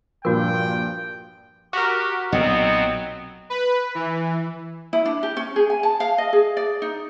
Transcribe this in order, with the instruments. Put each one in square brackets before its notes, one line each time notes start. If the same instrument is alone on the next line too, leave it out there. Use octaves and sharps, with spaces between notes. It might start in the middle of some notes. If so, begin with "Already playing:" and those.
[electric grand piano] G2 A#2 F3 [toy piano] F#4 A#4 [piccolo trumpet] G5
[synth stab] F#4 A#4 [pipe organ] G4 [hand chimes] F#5 F#6
[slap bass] B1 A#2 [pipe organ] F#3 B3 C4 [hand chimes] D#5
[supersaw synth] B4
E3
[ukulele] E4
D4
G4
C#4
G#4
G#5
A5
F5
D#5
G#4
D5
D#4